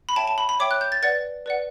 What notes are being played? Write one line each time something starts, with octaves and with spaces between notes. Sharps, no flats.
B5
C#5 E5 G5 A5
A5
B5
B5
C#5 E5 G5 D6
F#6
G6
A6
B4 D5 F#5 A6
B4 D5 F#5